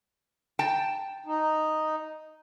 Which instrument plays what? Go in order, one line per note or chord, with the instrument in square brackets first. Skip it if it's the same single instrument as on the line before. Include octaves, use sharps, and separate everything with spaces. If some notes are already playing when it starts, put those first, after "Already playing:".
[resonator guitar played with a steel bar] G5 A5
[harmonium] D#4